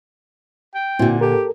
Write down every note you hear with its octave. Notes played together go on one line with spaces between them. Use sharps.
G5
A#2 D3 C4 E4 F#4
G4 A4 A#4